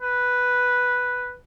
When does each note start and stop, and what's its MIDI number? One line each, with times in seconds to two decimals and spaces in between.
0.02 1.34 71